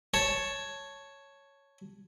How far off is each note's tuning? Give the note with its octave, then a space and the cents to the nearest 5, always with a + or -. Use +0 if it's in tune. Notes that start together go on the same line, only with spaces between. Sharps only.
C#5 +0 A5 +0